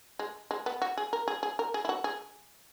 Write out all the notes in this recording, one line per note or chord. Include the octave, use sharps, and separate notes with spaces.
G#3
G#3
B3
F#4
G#4
A#4
G#4
G#4
A#4
G#4
E4
F#4
G#4